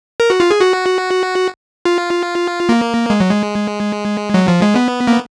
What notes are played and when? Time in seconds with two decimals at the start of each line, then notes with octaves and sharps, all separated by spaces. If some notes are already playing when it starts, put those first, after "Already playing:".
0.20 A#4
0.30 F#4
0.40 F4
0.51 G#4
0.61 F#4
1.85 F4
2.69 A#3
3.10 G#3
3.20 F#3
3.30 G#3
4.34 F#3
4.48 F3
4.62 G#3
4.76 B3
5.07 A#3